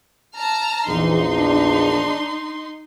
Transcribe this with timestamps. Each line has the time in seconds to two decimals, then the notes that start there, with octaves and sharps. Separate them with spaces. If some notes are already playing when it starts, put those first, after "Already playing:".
0.37 A5 A#5 F6
0.88 A#1 E2 E3 D#4 C6
1.35 D4